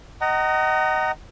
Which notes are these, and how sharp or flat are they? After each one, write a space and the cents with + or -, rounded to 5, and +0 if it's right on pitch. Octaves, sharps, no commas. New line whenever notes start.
D#5 +0 F#5 +35 A#5 -15